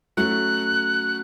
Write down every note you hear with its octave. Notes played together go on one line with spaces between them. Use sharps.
F#3 A3 C#4 F#6